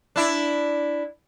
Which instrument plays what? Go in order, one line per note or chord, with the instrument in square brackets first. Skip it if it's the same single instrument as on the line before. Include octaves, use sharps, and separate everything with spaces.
[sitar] D4 E4